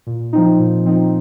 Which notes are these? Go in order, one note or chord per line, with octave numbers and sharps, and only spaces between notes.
A#2
F3 C4 D#4
A#2
F3 C4 D#4